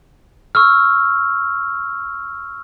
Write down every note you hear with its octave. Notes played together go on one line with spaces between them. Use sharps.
C#6 E6 F6